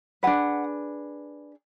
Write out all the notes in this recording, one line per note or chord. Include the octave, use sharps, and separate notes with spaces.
D4 G#4 B4 F#5